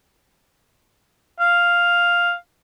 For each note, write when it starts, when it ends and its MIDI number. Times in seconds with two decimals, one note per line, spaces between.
1.40 2.33 77